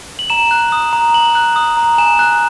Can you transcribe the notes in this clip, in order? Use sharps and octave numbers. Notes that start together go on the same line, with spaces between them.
F#7
A#5 E7
F#6
D#6
A#5
A#5 F#7
F#6
D#6
A#5
G#5 E7
F#6